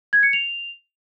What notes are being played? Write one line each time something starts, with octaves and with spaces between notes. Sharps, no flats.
G#6
C#7
F7